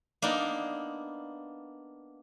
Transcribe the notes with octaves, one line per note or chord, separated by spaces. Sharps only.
A#3 B3 D4 D#4